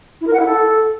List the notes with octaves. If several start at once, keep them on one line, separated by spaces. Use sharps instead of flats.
E4
A#4
F#5
E4
A4